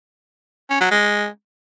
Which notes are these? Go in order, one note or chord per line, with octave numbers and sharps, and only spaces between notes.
C#4
F#3
G#3